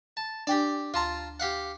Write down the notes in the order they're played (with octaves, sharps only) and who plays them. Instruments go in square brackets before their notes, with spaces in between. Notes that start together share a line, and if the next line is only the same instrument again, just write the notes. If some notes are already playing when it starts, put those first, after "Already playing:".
[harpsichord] A5
[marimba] D4 G5 G#5 [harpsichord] G4 D5
[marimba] D2 C6 [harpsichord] F4 A5 A#5
[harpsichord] G4 F5 F#5